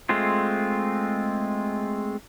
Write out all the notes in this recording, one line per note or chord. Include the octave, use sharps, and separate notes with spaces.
G#3 A3 C4 F4